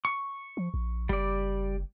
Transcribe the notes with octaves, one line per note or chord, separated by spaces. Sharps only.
C#6
F3
A#1
F#1 G3 D5